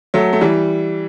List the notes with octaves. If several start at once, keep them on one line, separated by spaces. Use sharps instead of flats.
F#3 A3
A3
E3 G3